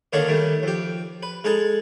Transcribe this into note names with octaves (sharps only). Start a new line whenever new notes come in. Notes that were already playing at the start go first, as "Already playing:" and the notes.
D3 D#3 A#3 C#4 G#4 A4
D#3 G3 A3
F2 G4
B4
G#3 D#4 G#4 A4